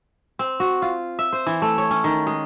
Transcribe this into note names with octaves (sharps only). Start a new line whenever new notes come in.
C4
F#4
F4
E5
C5
E3
A3
C#5
C#4
D#3
G#3